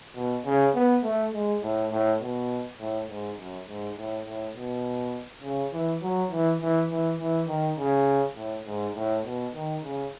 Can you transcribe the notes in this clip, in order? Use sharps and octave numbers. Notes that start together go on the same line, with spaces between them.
B2
C#3
B3
A3
G#3
A2
A2
B2
A2
G#2
F#2
G#2
A2
A2
B2
C#3
E3
F#3
E3
E3
E3
E3
D#3
C#3
A2
G#2
A2
B2
D#3
C#3